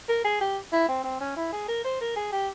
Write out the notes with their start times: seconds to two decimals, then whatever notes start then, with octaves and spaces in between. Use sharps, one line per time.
0.09 A#4
0.24 G#4
0.41 G4
0.72 E4
0.88 C4
1.04 C4
1.21 C#4
1.36 E4
1.53 G#4
1.68 A#4
1.84 C5
2.01 A#4
2.16 G#4
2.32 G4